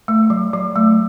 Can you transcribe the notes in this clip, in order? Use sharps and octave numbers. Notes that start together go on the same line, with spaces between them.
A3
F#3
F#3
A3